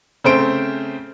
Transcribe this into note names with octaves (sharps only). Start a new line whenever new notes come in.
C#3 A3 C4 C5 D7